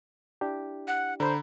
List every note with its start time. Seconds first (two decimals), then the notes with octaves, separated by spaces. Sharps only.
0.41 D4 E4 G4
0.87 F#5
1.20 D3 C5 A#5 B5